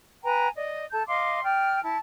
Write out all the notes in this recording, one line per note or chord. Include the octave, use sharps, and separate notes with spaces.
B4 G5 G#5 A#5
D5 D#5
A4 A5 G6
D#5 F5 C6 D6
D5 G5 F6
E4 A5